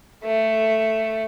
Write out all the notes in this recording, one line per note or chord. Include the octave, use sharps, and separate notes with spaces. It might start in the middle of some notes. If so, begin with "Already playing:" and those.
A3